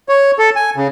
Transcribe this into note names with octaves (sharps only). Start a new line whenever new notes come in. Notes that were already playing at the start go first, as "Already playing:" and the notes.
C#5
A4
G#5
C#3